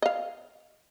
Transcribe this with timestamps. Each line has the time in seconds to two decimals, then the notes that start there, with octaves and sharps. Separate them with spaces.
0.02 D#5 F5